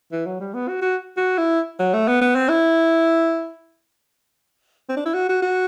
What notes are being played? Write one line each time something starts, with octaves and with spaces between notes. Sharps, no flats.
E3
F#3
G3
B3
F#4
F#4
F#4
E4
F#3
A3
B3
B3
C4
E4
C4
D4
E4
F#4
F#4
F#4